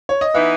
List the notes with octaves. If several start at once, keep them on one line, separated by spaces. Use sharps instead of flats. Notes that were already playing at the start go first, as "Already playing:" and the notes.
C#5
D#5
E3 B3 D#4 E5